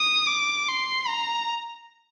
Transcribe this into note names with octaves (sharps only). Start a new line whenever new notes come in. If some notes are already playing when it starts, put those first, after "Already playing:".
Already playing: D#6
D6
C6
A#5